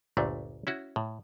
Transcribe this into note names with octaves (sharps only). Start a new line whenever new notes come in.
G1 D2 A#2 A3
C#4 E4 F#4
A2